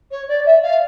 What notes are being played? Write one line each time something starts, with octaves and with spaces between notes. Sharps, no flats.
C#5
D5
E5
F5